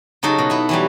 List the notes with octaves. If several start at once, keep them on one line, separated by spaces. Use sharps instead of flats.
C#3 F#3 D#4 A4
B2
B3 E4
E3 F#3 G3